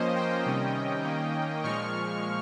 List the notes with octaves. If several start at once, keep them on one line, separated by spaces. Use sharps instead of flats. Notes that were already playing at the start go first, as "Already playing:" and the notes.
Already playing: F3 A#3 C#4 C5 D#5
D#5 G5
C3 D#3 G3 C#4
D#3 A#3 C#4
A#2 F3 G#3 C#6 F6